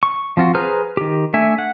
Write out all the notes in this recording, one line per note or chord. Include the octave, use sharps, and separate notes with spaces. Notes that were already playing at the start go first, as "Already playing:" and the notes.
C#6
F3 C4 F4 F#4
G#4 B4 C5 A#5 F6
D#3 G4
A3 D4 E5 G#5
F#5